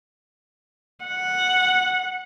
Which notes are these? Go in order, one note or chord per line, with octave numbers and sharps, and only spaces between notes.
F#5